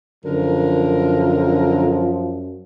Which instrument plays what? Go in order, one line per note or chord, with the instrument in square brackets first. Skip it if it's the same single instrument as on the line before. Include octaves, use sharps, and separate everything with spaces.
[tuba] F#2 [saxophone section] D3 A#4 [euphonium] F3